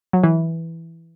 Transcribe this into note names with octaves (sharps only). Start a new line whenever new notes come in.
F#3
E3